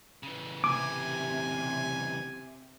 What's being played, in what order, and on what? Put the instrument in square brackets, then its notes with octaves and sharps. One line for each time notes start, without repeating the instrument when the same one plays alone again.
[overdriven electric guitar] C#3 E3
[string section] C3 [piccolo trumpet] G#5 [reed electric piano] D6